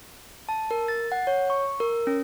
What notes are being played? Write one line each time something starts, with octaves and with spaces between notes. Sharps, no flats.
A5
A#4
A6
F#5
C#5
C#6
A#4
C#4